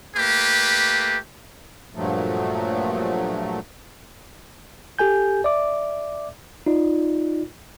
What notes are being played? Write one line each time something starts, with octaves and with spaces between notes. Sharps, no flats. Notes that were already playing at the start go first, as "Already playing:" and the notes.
A3 A#3 G4 B4
G2 A#2 F3 F#3 A3
G4 A4 G#5 G6
D5 E5 D6
D#4 F4 D5